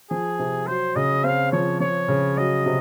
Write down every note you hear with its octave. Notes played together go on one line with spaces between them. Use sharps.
F3 G#4
C3
F#3 C5
C#3 D#5
C4 F5
F3 C#5
F3 C#5
C#3
F#3 D#5
C3